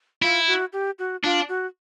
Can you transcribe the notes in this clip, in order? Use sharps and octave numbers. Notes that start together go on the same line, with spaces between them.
E4 F4
F#4
G4
F#4
D4 F4
F#4